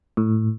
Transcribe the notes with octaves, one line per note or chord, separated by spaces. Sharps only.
A2